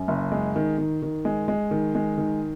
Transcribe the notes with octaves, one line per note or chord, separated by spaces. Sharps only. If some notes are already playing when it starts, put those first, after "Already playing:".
Already playing: F#2
F#1
G#3
D#3
D#3
D#3
G#3
G#3
D#3
G#3
D#3